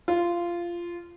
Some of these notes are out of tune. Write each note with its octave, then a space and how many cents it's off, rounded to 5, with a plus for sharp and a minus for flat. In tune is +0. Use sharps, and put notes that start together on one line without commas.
F4 -15